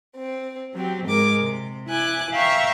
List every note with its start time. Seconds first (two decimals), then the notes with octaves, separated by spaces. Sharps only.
0.16 C4
0.75 F#3 C4 G4
1.07 G#2 G#3 A#4 D6
1.40 C3
1.89 E4 G#5 D6 F#6
2.33 E5 F5 G5 A#5 C#6